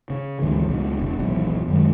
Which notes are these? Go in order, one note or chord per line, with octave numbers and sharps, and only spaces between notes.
C#3
D2 G#2 E3
C#2 B2
E1
D#1 B1 B2 E3
F#2 D#3 G#3